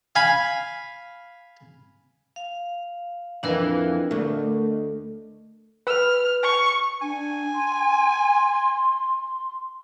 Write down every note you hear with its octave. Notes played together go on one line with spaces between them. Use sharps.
F5 G#5 B5
F5
F2 E3 D4 A#4 D#5
D2 A3
B4 F6
C#6
D4 G#5
C6